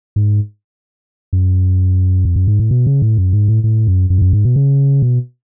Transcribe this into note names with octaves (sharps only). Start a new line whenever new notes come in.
G#2
F#2
F2
F#2
G#2
A2
B2
C#3
A2
F#2
G#2
A2
A2
F#2
F#2
G#2
F#2
G#2
B2
C#3
B2